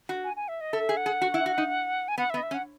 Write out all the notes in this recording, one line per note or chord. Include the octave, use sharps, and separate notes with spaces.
F#4
G#5
G#5
E5
D#5
A4 E5
G#4
F#5
G#4
F#4
E4
F#4
D#4
G#5
B3 F#5
E5
B3
D#5
E5
C#4
F#5